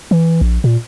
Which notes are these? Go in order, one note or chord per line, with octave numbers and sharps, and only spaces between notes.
E3
A#1
A#2